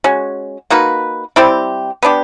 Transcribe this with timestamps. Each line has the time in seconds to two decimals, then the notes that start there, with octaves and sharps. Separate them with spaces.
0.04 G#3 C#4 F#4
0.70 A#3 D#4 F#4 B4
1.36 G3 C4 E4 G4
2.03 B3 D4 G4